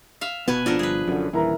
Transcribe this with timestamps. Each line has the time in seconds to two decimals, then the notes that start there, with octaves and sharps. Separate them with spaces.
0.21 E5 F5
0.48 F1 B2 B3 F#4 B4 G#5 A5
0.66 F3 D4 A4 A#4
0.79 G1 G#4 B4
1.08 F#2 D3
1.33 D#1 E3 E4 A#4 A#5